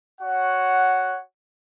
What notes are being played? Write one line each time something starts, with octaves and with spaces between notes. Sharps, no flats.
F#4 C#5 F#5